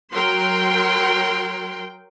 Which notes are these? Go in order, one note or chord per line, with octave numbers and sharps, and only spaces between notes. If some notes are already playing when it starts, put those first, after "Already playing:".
F#3 A#4 G5 C6